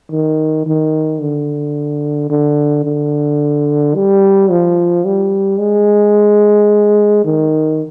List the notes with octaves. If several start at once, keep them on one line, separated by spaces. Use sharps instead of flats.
D#3
D#3
D3
D3
D3
G3
F3
G3
G#3
D#3